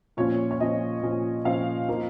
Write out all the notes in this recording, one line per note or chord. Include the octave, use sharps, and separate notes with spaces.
A#2 F3 C#4 C#5
C#5
A#2 F3 C#4 D#5
A#2 F3 C#4
A#2 F3 C#4 F5
F3 A#3 D#4